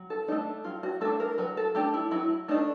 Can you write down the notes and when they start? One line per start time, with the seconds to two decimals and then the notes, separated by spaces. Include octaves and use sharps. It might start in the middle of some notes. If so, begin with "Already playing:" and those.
Already playing: F#3
0.10 A4
0.28 D4 D#4
0.32 A3
0.64 F#3 F4
0.83 F#4
1.01 A3 A4
1.05 D4
1.20 A#4
1.38 F#3 B4
1.57 A4
1.75 A3 D4 G4
1.94 E4
2.11 F#3 E4
2.48 A3 D4 D#4